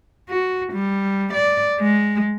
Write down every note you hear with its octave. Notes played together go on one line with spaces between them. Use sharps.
F#4
G3
D5
G#3